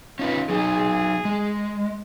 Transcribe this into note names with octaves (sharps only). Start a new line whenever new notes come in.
C#4 D#4 F4 B4
F#3 D#4 G#4
G#3